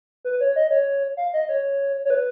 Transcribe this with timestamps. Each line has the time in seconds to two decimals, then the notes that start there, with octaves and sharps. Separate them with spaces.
0.25 B4
0.40 C#5
0.56 D#5
0.70 C#5
1.17 F5
1.33 D#5
1.49 C#5
2.05 C#5
2.10 B4